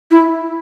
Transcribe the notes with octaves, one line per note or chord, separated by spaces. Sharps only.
E4